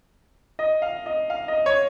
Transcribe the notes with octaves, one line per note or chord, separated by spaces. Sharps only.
D#5
F5
D#5
F5
D#5
C#5